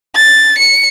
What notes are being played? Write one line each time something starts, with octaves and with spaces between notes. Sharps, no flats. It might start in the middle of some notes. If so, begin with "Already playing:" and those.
A6
C#7